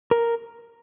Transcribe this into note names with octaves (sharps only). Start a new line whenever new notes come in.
A#4